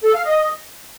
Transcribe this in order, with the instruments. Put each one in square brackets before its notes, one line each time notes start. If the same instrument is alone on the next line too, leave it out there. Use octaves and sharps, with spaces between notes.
[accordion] A4
F5
D#5